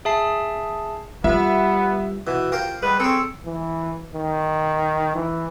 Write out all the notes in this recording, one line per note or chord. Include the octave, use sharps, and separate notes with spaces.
G#4 E5 A5 C7
G3 B3 F4 E5
B2 E3
F4 G4 A#4 C5
G3 G#3 B4
C4 G#4 A4 C#5
E3
D#3
E3